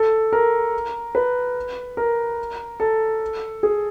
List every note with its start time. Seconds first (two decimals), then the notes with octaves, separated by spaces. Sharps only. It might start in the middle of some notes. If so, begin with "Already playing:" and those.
Already playing: A4
0.33 A#4
1.15 B4
1.97 A#4
2.80 A4
3.63 G#4